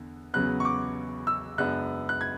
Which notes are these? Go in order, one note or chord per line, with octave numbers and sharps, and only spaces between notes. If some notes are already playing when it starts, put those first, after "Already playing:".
Already playing: E2 D3
E2 C#3 F#3 B3 F#6
C#6
D6
E6
F#2 C#3 G#3 B3 D4 F#6
F#6
G#6